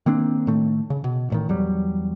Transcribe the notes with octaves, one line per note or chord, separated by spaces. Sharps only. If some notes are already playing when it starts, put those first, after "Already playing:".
D#3 A#3 C4 D4
A2 D#3 A3
C#3
B2
A1 A2 D#3
E2 F#3 G3